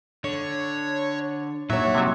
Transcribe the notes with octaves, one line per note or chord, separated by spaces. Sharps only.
D3 C#5
A#2 F#3 D#4 C#5 E5 F#5
C3 F#3